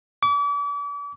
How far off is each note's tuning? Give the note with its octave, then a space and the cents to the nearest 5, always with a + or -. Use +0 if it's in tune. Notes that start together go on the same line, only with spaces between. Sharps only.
D6 -40